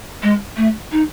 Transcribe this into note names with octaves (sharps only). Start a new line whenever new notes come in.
G#3
A3
D#4